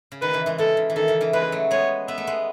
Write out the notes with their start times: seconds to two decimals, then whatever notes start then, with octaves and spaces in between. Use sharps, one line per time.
0.12 C#3
0.22 D#3 B4
0.33 C#3 E3
0.46 E3 G#3
0.58 C#3 E3 A4
0.77 C#3
0.90 E3
0.96 D#3 A4
1.08 C#3 E3
1.21 C#3 E3
1.33 E3 G#3 B4
1.52 F#3 A3
1.71 G#3 B3 C#5
2.08 B3 E5
2.18 A3
2.27 G#3 B3